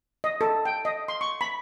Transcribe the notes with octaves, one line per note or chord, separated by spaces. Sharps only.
D#5
A4
G5
D#5
C6
C#6
B5